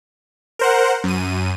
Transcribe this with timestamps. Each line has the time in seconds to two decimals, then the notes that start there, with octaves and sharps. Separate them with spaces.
0.59 A#4 C5 F#5
1.04 F#2 D#7